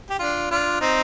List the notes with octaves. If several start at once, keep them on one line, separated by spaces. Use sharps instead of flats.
G4
D4 F4
D4 F4
C4 D#4